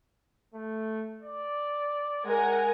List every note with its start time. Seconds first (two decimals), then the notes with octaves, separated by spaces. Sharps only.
0.54 A3
1.22 D5
2.25 G#3 A#4 F#5 G#5